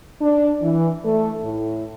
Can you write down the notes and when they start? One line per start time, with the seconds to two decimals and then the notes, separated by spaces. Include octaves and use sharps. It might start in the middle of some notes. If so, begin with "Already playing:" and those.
0.22 D4
0.63 E3
1.05 A3
1.43 A2